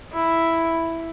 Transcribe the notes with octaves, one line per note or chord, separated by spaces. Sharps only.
E4